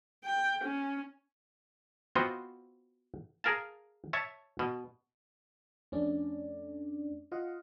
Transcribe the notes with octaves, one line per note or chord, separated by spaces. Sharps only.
G5
C#4
B3 C4 F4 F#4 C5 D#5
G#4 A#4 F5 A5
C#5 E5 A5
B2
F2 A3 C#4 D4 D5
F4 D#5 F5 F#5